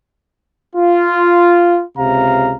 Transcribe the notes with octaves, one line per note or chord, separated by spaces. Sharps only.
F4
C#2 C3 F5 A#5